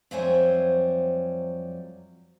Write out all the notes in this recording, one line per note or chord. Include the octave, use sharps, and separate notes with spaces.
F2 F#3 G3 C5 E5 G#5